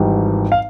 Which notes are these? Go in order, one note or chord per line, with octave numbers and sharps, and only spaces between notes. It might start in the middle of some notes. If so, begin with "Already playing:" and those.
Already playing: G#1 G#2 E3 G3
F5